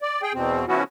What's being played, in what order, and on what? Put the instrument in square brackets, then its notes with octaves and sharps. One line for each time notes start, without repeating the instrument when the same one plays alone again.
[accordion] D5
G#4 G5
E2 B2 C4
C#3 F3 B3 C#4 E4 F#4